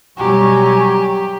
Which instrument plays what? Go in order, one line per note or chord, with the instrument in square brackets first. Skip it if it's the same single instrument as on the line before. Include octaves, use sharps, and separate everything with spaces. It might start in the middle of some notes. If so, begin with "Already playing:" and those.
[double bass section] B2 F#3 G3 [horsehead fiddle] G4 [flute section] G#5 A#5 C#6